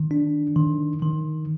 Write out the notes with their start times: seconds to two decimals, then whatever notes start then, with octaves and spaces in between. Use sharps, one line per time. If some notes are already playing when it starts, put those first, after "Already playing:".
Already playing: D#3
0.11 D4
0.56 D#3
1.02 D#3